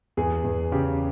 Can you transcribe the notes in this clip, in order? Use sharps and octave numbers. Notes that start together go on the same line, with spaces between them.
E2 G#4
E2
C#3 G4